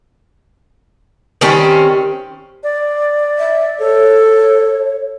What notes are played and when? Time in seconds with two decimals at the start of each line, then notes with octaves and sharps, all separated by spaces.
1.41 D#3 G3 C4 C#4
2.63 D5
3.39 E5
3.79 A4 C#5